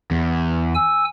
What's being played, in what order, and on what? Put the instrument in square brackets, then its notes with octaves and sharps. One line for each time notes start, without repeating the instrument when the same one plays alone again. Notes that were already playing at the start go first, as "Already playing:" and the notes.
[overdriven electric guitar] E2
[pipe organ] G#5 E6